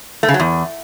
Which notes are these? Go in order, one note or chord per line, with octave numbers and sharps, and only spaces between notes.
A3
C#3
F#3
E2